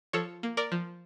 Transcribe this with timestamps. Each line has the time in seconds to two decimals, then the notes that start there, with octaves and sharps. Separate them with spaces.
0.13 F3 A4 C#5
0.43 A#3
0.57 A#4 D5
0.72 F3